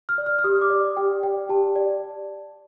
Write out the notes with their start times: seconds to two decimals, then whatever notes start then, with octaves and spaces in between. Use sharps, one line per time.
0.09 F6
0.18 D5
0.26 F6
0.39 F6
0.44 G4 D#6
0.61 D6
0.70 D5
0.97 G4 G5
1.23 D5 G5
1.49 G4 A5
1.76 D5